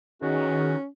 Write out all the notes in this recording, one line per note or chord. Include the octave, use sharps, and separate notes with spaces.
E2 D#3 C#4 D#4 F#4 G#4